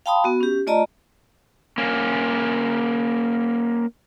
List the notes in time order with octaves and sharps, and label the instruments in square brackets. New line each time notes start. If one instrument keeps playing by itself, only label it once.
[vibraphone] F5 G5 A5 B5 C6 D#6
B3 F#4
C#4 G4
A3 F4 D5 D#5 A5 A#5
[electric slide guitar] A#3 C#4